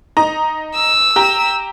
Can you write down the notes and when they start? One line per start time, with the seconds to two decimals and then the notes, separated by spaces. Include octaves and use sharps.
0.17 D#4 A#5
0.75 E6
1.16 G4 A#5